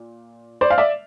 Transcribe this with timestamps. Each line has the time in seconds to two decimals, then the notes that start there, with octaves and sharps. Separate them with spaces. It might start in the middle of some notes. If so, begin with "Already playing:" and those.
Already playing: A#2
0.61 C5 D5
0.70 F5
0.78 D5 E5